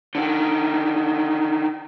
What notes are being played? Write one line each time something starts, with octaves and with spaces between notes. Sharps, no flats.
D3 D#3